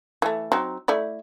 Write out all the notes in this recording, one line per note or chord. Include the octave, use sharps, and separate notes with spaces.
E3 A3
F#3 C4 D#4
A3 E4 D5